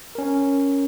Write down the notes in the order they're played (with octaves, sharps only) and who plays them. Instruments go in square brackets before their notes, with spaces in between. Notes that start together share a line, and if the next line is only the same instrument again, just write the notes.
[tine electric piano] C#4 A#4